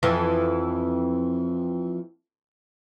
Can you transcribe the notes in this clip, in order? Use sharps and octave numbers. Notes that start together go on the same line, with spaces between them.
F2 E3